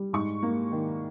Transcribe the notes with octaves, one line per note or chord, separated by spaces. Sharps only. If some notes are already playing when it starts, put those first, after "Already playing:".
Already playing: G3
G#2 C#6
A#3
D#3